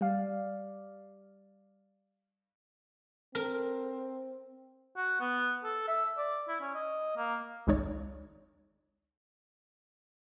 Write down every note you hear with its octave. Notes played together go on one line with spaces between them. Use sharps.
G3 D5 F5
C4 A#4
F#4
B3
A4
E5
D5
E4
C#4
D#5
A#3
G#1 C#2 G#3 D#4 C#5 D5